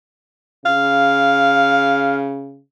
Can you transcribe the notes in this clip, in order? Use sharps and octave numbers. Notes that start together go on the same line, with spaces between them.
C#3 F5